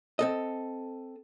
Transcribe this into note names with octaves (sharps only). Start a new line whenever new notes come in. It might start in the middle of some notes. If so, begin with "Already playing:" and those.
C4 A4 D#5